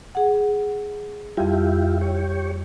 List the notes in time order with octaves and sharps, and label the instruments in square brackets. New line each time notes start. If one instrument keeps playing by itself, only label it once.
[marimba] G#4 F#5
[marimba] F2 G3 [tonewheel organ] E4 F4 G4
[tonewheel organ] G4 C#5